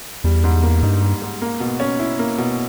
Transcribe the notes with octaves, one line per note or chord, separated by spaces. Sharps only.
E2 G3
G#2
A#3
G2 D#4
G3
G#2
A#3
B2
C#4
E4
A#3
B2